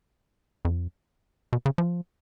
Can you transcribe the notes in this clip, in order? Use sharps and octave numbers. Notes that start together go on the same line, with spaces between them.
F2
B2
C#3
F3